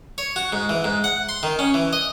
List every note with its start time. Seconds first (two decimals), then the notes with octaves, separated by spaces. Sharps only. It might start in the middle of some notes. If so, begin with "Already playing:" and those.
0.18 C#5
0.36 F#4
0.53 G#2
0.69 E3
0.84 G#2
1.04 F#5
1.29 C6
1.43 D#3
1.59 C#4
1.74 E3
1.93 D#5